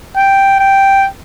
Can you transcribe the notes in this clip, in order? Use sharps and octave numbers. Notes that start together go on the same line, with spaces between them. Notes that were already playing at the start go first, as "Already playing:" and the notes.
G5
G5